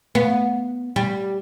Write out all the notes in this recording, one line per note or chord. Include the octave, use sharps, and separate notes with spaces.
B3
G3